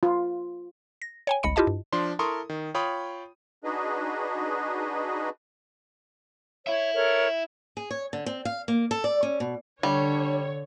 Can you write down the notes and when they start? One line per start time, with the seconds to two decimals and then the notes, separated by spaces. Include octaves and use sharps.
0.03 F4
1.02 A#6
1.27 C#5 G5 G#5
1.43 G1 C#2 D#5 B5 C#7
1.56 E4 F4 G4 D#5 A5
1.67 G2
1.93 F3 D4 C6
2.19 E4 A4 A#4 C6 C#6 D#6
2.49 D#3
2.74 F4 C#5 G5 B5 D#6
3.64 D4 D#4 F#4 G#4 B4 D#5
6.67 E4 C#5 E5
6.93 A4 A#4 C#5
7.77 G#4
7.91 C#5
8.13 D3
8.26 C4
8.45 F5
8.68 A#3
8.91 A4
9.04 D5
9.23 C#4
9.40 B2
9.83 D3 G3 D4 C#5